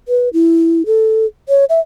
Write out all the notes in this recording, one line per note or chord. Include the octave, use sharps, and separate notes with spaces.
B4
E4
A4
C#5
E5